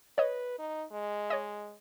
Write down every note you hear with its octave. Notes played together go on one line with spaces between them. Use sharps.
B4 C#5 D#5
D#4
G#3
C#5 D#5